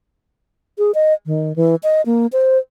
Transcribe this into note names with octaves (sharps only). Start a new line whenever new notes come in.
G#4
D#5
D#3
E3
D#5
A#3
C5